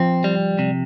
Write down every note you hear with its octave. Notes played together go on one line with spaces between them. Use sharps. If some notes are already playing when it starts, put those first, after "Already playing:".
Already playing: F3 C4
G3
C3